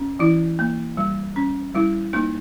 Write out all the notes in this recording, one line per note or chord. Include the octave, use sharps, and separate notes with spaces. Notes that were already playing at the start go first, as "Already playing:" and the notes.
Already playing: C#4
E3 E4
A#3
G3
C#4
G3 E4
A#3 D#4